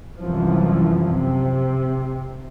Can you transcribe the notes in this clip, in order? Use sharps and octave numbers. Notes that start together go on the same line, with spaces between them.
C2 F#2 E3 F3
C3